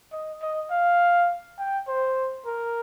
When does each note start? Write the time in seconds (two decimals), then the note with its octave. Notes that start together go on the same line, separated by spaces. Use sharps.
0.13 D#5
0.42 D#5
0.71 F5
1.59 G5
1.88 C5
2.46 A#4